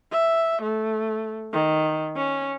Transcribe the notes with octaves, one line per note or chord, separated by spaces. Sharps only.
E5
A3
D#3
C#4